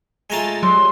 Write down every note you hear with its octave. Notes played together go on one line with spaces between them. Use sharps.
G#3 A3 F4 G#5 A#5 A6
F#3 G3 C6